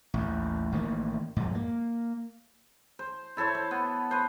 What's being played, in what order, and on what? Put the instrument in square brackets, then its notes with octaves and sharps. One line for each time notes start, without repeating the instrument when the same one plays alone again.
[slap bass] A1 D#2
A1 D#3 A#3
F2 G#2
A#3
[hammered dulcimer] C5
E4 A4 C5 C#5
C5
B3
B4 C5